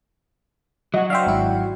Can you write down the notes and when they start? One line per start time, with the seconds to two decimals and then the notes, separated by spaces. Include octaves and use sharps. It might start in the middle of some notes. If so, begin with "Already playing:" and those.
0.94 F#3 F#4 D#5 F#5
1.10 D4 C5 E5 F5 G5
1.26 G#1 E4